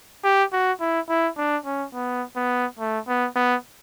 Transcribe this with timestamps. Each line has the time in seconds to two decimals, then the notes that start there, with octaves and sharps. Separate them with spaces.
0.24 G4
0.52 F#4
0.80 E4
1.09 E4
1.37 D4
1.66 C#4
1.94 B3
2.36 B3
2.79 A3
3.08 B3
3.36 B3